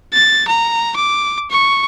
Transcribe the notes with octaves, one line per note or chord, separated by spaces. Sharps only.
A6
A#5
D6
C#6